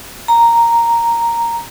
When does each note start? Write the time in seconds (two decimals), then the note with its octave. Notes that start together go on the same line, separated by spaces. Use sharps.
0.28 A#5